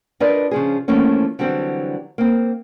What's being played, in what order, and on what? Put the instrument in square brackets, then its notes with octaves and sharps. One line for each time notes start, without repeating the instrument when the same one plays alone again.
[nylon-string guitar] D4 F4 A#4 B4 D5 D#5
C#3 F3 G#4
E3 F3 A3 A#3 C#4
D3 E3 F#3 G3 C4
A#3 C4